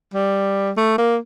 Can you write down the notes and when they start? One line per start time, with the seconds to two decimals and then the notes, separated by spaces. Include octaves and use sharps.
0.14 G3
0.77 A3
0.98 A#3